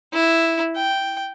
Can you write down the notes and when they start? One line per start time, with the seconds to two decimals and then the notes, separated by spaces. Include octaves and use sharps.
0.13 E4
0.76 G5